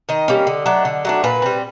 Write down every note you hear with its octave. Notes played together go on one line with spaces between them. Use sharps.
D#3 D#5
G3 A#3 C#4
D3
F#3 A3 D4
D3
F#3 A3 D4
A#2 B4
G3 C4